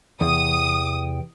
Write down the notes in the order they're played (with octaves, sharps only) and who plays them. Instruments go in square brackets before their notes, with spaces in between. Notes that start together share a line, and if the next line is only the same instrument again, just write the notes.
[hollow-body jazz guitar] E2 [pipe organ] C3 E3 G5 [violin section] D#6